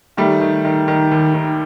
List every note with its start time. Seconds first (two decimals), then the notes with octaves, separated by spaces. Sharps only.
0.17 D#3 G3 A3
0.41 D#3
0.65 D#3
0.88 D#3
1.11 D#2
1.34 D#3